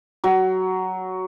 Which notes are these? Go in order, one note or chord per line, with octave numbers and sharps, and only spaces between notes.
F#3